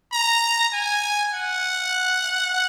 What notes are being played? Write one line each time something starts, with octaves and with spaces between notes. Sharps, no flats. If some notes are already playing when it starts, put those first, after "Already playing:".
A#5
G#5
F#5